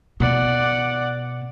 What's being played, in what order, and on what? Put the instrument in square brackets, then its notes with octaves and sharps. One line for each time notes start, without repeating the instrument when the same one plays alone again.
[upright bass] B2 [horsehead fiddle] D5 F#5